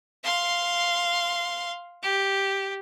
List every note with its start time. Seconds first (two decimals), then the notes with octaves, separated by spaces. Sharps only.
0.24 F5 C6
2.02 G4